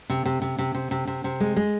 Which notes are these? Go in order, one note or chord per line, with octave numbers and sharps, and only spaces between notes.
C3
C3
C3
C3
C3
C3
C3
C3
G#3
G#3